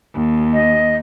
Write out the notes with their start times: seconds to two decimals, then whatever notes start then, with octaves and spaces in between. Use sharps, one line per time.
0.14 D#2
0.53 D#5